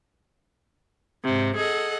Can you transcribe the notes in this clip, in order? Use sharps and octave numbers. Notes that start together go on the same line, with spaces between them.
G#2 C3
G#4 A4 D#5 F#5